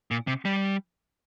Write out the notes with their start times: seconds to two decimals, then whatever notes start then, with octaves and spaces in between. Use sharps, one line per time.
0.11 A#2
0.27 C3
0.45 G3